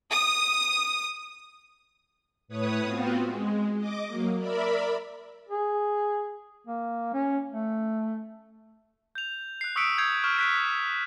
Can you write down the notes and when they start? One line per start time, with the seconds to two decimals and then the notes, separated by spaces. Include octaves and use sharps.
0.10 D#6
2.48 A2 B4 C#5 D#6
2.84 B3 C4 F4 F#4
3.24 G#3
3.76 D#5 D6
4.07 F#3 A#3
4.38 A#4 D5 E5 B5
5.49 G#4
6.67 A#3
7.14 C#4
7.51 A3
9.15 G6 F7
9.61 F#6 C7
9.76 C#6 D#6 E6 B6 C#7 D7
9.98 D#6 G6 G#6 C7 C#7 F7
10.24 C#6 F6 E7
10.37 F#6 B6 D7